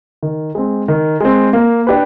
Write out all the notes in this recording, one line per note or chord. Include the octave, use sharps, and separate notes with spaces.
D#3
G#3 C4
D#3
G#3 C4
A#3
D4 G4 B4